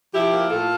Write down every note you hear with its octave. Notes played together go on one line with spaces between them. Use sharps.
F3 E4 G4
A#3
A2 F4 A4